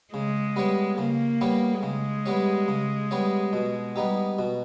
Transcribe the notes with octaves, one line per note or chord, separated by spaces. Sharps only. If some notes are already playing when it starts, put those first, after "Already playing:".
C#3 G#3
G3 B3 G4 C#5
C#3 A#3
G3 B3 G4 C#5
C#3 G#3
G3 B3 G4 C#5
C#3
G3 B3 G4 C#5
B2
G3 B3 D#4 G4
B2